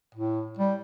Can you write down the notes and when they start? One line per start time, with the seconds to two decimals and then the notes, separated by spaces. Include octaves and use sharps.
0.15 A2
0.59 G3